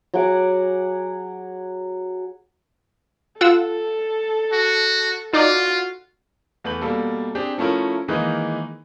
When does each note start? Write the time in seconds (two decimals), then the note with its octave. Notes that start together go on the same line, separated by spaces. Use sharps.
0.14 F#3 G#4 F#5 D6
3.41 F4 A4 F#5 E6
4.52 F#4
5.33 D#4 F4 F#4 D5
6.64 E2 A3 B4 G6 F#7
6.82 B2 G3 A#3 A4
7.35 C4 D4 G4 G#4
7.58 F3 A3 C#4 E4 A#4
8.08 D#3 E3 G#3 A#3 D#4 B4